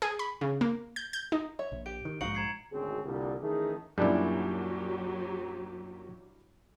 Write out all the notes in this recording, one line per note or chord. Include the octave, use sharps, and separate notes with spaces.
G#4
B5
C#3
A#3
G6
G6
D#4
C#5 E5
A#1
G4 D7
D#3
A#1 G#2 D#4 F#4 F5 C#7 F#7
A#5 G#6 C7
G#1 D2 B2 C4 C#4 G#4
C2 A#2 D3 G3
D#3 E3 A3 C#4 D#4 G#4
F#2 A#2 F#3 G3 D4 E4 G4